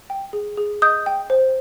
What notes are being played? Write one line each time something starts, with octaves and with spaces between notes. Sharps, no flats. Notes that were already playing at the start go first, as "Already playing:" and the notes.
G5
G#4
G#4
D#5 D#6 G6
G5
C5